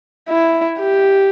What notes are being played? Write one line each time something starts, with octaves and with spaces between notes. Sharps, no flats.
E4
G4